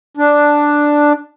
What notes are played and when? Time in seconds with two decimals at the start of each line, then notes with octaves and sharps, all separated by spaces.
0.17 D4